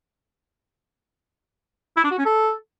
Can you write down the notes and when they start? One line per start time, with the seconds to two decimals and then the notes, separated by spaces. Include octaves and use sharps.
1.97 E4
2.04 D4
2.11 F#4
2.18 C#4
2.25 A4